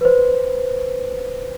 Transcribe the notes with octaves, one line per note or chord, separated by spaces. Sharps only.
B4 C5